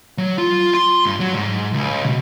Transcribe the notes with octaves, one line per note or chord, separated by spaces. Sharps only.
F#3
F4
C6
G2
F#3
G#2
C#2
B2